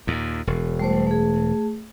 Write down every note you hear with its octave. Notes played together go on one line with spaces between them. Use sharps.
D#2 A#2
E1
G3 A3 C5
A3 G#4